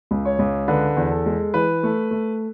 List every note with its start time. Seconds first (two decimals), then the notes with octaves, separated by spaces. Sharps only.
0.11 C#2
0.25 C#5
0.39 C#2
0.68 D3 B4
0.96 E2
1.10 A4
1.26 G#3
1.54 E3 B4
1.83 A3
2.11 A3